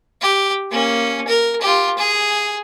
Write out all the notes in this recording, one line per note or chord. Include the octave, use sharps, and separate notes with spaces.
G4
A#3 C#4
A#4
F4 G4
G#4